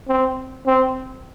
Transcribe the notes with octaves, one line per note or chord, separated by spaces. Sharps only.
C4
C4